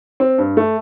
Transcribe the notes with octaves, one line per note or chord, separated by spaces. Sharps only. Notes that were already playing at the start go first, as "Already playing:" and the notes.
C4
G2
A3